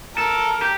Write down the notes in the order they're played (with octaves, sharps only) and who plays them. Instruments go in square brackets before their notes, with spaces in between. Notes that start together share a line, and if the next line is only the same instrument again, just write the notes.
[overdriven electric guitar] A4 [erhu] A#4
[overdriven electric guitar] G4